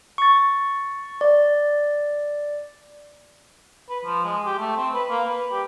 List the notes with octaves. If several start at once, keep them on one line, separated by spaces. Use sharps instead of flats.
C#6 A6
D5
B4
F3
G#3
G4
A3
C4
B4
A#3
B4
G4